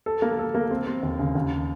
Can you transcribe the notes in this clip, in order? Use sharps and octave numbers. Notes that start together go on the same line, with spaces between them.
A4
A#3
A4
A#3
C4
C4
D#2
C#3
D#2